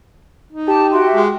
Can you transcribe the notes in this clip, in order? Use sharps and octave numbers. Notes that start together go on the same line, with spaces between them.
D#4
G4 A5
F#4 E5 G5 C6
G#3